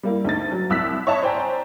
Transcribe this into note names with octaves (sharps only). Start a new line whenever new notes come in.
G3 A#3 E4
D2 D#4 A6
F#3
C2 E6 F#6 B6
C#5 D#5 E5 A5
C5 D5 G5 G#5 A#5